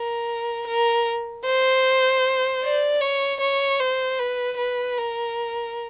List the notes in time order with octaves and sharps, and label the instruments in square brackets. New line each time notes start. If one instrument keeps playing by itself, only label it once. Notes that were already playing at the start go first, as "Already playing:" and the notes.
Already playing: [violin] A#4
A#4
C5
D5
C#5
C#5
C5
B4
B4
A#4